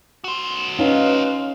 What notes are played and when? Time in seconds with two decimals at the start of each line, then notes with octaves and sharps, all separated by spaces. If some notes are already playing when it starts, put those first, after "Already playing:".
0.24 F#4 C5
0.79 C#4 D#4 B4 F5